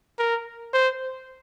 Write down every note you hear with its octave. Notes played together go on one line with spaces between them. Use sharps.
A#4
C5